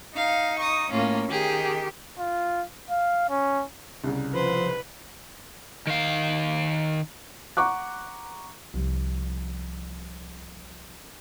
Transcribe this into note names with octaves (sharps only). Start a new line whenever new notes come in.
D#4 F5
C#6 D#6
A2 A#3 C#4 F4
D#3 G4 G#4
F4
F5
C#4
C2 C#3
F3 B4 C5
D#3 F5
F#5 A#5 C#6 D6 F#6
C2 F3